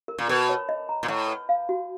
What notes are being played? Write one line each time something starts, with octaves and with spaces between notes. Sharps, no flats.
A#4
A#2
B2 A#4
C#5
D#5
A#5
A#2
A2 F#5
B4
F5
F#4